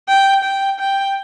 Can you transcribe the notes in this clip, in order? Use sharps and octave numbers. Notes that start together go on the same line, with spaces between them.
G5
G5
G5